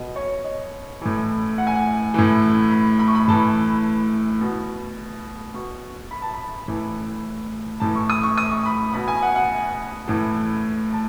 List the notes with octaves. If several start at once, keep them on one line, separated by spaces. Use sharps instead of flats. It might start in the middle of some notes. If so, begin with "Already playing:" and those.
Already playing: B2 D#5
C#5
D#5
A2 E3
F#5
G#5
F#5
A2 E3
B5
B5
C#6
B5
A2 E3 A5
B2
B2 C#6
B5
A5
B5
A2 E3
A2 E3 A5
C#6
D#6
C#6
D#6
C#6
B5
B2 B5
G#5
F#5
F#5
A2 E3
A5